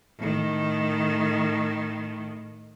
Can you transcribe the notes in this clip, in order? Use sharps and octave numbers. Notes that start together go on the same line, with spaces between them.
A2 D#3